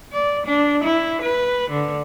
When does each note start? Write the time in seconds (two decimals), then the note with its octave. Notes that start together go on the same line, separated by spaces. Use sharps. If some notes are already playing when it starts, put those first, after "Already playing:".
0.13 D5
0.46 D4
0.84 E4
1.22 B4
1.70 D3